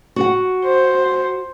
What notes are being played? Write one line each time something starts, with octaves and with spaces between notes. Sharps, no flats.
F#4 F#5
C5